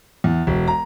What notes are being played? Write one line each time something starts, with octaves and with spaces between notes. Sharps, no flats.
E2
E1
A#5